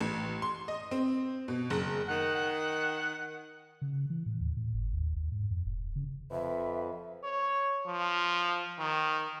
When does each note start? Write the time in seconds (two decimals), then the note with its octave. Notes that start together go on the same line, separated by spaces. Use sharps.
0.01 A1
0.42 C6
0.68 D#5
0.91 C4
1.48 B2
1.70 F#1
2.07 D#3 F#5
3.82 C#3
4.10 E3
4.26 A2
4.41 D#2
4.57 A2
4.74 G1
4.93 D#2
5.16 D#2
5.32 G#2
5.51 F2
5.65 E1
5.96 C#3
6.31 F2 B4 E5
7.24 C#5
7.86 F3
8.79 D#3